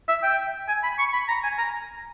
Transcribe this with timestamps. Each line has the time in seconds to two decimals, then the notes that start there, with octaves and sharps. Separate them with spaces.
0.09 E5
0.23 G5
0.68 G#5
0.83 B5
0.99 C#6
1.13 B5
1.29 A#5
1.44 G#5
1.58 A#5